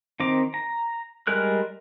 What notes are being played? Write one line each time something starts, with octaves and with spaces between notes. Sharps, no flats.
D#3 C4 A#5 D6
A#5
G3 G#3 A#4 F#6